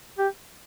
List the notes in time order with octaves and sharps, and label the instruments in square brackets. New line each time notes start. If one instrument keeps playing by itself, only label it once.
[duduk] G4